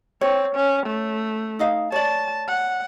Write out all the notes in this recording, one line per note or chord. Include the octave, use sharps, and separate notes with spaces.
C4 C#5
C#4
A3
D#4 D#5 F5
C#5 D5 A5
F#5